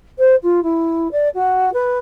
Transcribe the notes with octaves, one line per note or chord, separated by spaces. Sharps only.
C5
F4
E4
D5
F#4
B4